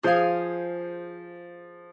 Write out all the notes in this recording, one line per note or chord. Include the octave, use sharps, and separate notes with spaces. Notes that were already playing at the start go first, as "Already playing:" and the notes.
F3 G#4 C5 F5 G#5